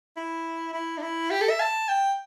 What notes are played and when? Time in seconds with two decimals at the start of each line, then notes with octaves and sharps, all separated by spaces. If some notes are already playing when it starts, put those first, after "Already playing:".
0.17 E4
0.73 E4
0.98 D4
1.02 E4
1.31 G4
1.41 A4
1.50 E5
1.60 A5
1.89 G5